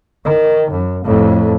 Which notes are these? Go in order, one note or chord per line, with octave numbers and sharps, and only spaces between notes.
D#3
F#2
F2 A2